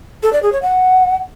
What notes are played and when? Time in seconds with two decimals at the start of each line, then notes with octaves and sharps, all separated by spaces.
0.23 A4
0.33 D5
0.43 G#4
0.52 C#5
0.62 F#5